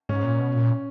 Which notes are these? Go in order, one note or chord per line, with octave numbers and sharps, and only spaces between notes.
G#2 C#4
A#2
B2
A#2